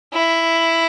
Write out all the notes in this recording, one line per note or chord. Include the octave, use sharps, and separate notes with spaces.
E4